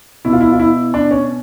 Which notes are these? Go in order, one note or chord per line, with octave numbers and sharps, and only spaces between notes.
B2 E4
F4
E4
F4
E4
D4
C#4